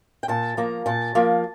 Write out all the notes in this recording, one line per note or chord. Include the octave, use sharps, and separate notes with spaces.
G5
A#2 A5
F3 A#3 A#5
A#2 A5
F3 A#3